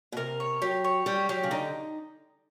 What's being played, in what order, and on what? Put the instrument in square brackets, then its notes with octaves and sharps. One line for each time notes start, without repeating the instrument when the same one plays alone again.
[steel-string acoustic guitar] B2
[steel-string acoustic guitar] C3 [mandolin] A#4
[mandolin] C#5
[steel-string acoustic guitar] F#3 [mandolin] G4
[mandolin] C#5
[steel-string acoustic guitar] G3 [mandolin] G4
[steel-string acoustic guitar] F#3 [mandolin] G4
[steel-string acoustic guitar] C#3
[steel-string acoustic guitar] D3 [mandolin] D#4